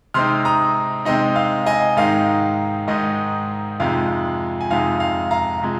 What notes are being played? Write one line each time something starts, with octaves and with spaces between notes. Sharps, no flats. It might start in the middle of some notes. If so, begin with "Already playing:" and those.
C3 G#3 C4 D#4 C6 F6
A#5 D#6
C3 G#3 C4 D#4 D#5
F5
D#5 G#5
G#2 D#3 G#3 D#4 F5
G#2 D#3 G#3 D#4 D#5
F2 C3 F3 G#3 D#4 F5
G#5
F2 C3 F3 G#3 D#4 F5
F5
F5 A#5
C3 F3 G#3